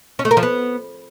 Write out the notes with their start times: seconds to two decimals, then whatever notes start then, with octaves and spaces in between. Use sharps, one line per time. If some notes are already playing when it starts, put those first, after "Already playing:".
0.19 C#4
0.25 A3
0.31 A#4
0.37 F3
0.43 B3